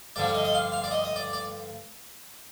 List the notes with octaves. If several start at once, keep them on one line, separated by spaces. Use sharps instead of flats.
G2 D3 F3 D5
D#5
D#5
F5
F5
D5
D#5
D#5
D5
D5